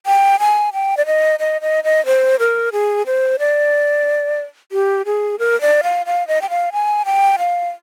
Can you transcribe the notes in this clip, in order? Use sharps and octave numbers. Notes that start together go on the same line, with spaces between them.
G5
G#5
G5
D5
D#5
D#5
D#5
D#5
C5
A#4
G#4
C5
D5
G4
G#4
A#4
D5
F5
F5
D#5
G5
F5
G#5
G5
F5